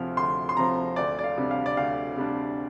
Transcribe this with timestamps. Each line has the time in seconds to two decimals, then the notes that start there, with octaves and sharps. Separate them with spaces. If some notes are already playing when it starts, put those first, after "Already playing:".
Already playing: D2 C3 F3 F6
0.17 D2 C6
0.49 C6
0.57 C3 F3 A#5
0.96 D2 D5
1.19 D5
1.24 F5
1.37 C3 G3 D4
1.51 F5
1.66 D5
1.77 D2 F5
2.16 C3 G3 D4